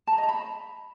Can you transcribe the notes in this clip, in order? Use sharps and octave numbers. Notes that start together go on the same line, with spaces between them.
A5
A#5
D#5
A#5
B5